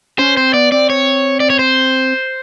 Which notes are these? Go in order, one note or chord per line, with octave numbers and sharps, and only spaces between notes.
C#4 C5
C4 C5
B3 D5
C4 D5
C#5
D5
C#5
C5